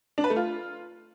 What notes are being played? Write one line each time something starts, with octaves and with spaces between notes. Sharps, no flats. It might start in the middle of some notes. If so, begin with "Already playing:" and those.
D4
B4
A3
F4